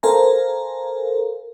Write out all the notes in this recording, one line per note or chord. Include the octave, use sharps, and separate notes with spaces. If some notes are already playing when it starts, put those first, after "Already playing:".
A4 A#4 C5 F5 G#5 A#5